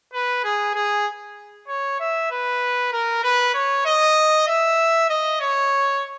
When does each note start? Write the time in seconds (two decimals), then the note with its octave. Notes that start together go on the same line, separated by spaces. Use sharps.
0.13 B4
0.44 G#4
0.75 G#4
1.68 C#5
1.99 E5
2.31 B4
2.92 A#4
3.23 B4
3.54 C#5
3.85 D#5
4.48 E5
5.10 D#5
5.41 C#5